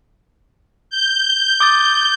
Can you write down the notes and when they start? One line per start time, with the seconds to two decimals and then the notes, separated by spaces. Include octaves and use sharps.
0.90 G6
1.60 D6 D#6 A6